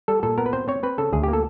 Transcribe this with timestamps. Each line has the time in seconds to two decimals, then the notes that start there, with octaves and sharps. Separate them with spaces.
0.08 G3 A4
0.23 A#2 A4
0.38 B3 A#4
0.46 B4
0.53 C4 C5
0.68 C4 C#5
0.83 C4 B4
0.98 C#3 A4
1.13 D2 G#4
1.24 G4
1.28 A#3
1.33 A4